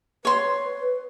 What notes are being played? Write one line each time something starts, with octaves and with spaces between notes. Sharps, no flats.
B4 C#5 C6